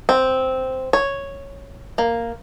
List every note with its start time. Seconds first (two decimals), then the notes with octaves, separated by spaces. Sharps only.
0.09 C4
0.93 C#5
1.98 A#3